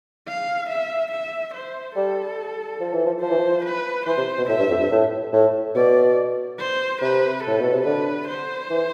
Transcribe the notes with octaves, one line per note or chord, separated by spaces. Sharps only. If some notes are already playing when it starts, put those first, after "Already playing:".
F5
E5
E5
C5
G3 A4
F3
E3
F3
F3 C5
E3
F3
B4
E3 C5
C3
B2
A2 E5
G2
F2
G2
A2
A2
B2 D5
C5
C3 B4
A2 A4
B2
C3
D3 B4
C5
E3